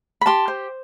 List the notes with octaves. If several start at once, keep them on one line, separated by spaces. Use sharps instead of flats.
B5
G4 A5 C6
C5